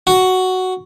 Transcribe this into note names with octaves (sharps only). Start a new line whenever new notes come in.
F#4